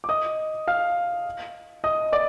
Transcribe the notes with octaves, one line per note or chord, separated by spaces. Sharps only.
D6
D#5 D#6
F5 F6
D#5 D#6
D5 D6